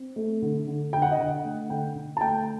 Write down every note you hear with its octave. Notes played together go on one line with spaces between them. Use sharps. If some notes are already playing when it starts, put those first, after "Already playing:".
Already playing: C4
A3
D3
D3
D3 G5
F#5
D#5
D3 F#5
A3
D3 G5
D3
A5
A3 G5